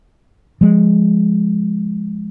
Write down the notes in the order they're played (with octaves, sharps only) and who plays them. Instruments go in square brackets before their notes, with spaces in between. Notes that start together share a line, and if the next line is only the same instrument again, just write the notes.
[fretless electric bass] F3 G#3